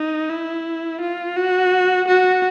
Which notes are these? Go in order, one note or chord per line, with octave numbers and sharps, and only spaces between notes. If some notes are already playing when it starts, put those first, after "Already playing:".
Already playing: D#4
E4
F4
F#4
F#4